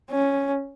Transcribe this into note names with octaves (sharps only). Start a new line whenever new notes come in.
C#4